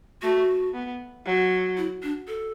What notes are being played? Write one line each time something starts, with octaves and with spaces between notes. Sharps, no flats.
A3 F#4
B3
F#3
E4
D4
A4